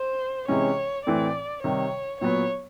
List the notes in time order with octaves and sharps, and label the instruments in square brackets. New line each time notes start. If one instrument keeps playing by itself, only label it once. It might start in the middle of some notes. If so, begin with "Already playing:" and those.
Already playing: [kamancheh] C5
[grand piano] C3 E3 G#3 C#4 [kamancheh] C#5
[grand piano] A2 E3 A3 C4 [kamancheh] D5
[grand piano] C3 D#3 G3 [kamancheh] C#5
[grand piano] A#2 F#3 B3 [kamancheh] C#5